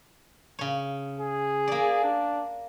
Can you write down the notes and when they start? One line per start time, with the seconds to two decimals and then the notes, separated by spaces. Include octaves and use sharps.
0.59 C#3 C#5
1.21 G#4
1.68 A#3 D5
2.04 D4